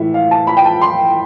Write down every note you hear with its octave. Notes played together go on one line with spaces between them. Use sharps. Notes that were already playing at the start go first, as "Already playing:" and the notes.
Already playing: A2 E3 E5
F5
A5
B5
G5
A5
C6